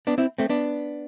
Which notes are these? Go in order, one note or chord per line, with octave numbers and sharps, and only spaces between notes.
B3 D4
C4 E4
A3 C4
B3 D4